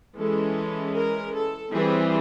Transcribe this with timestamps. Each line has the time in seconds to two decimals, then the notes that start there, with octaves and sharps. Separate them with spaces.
0.17 E3 G#3 C#4 A4
0.94 A#4
1.33 A4
1.71 E3 G3 C4 G#4